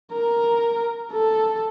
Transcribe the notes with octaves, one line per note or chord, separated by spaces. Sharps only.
A#4
A4